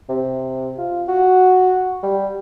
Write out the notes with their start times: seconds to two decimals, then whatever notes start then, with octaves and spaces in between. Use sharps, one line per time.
0.09 C3
0.78 F4
1.08 F#4
2.03 G3